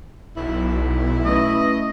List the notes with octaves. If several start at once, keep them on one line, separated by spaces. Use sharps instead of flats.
B1 E4
A3 C#4 B4 D#5